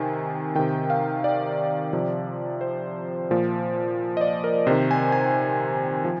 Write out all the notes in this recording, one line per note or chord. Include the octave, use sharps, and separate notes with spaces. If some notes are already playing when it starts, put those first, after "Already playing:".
Already playing: C3 D#3 G#5
C3 D#3 G5
F5
D5
C3 F3
C5
A#2 F3
D#5
D5
A#4
C3 D#3 C5
G#5
G#5
F3